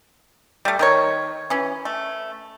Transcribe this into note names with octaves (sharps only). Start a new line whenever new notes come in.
G3 A3
D#3 A#4 C#5
E3 C#4
A3